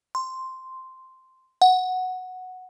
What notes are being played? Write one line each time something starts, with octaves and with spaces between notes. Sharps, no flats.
C6
F#5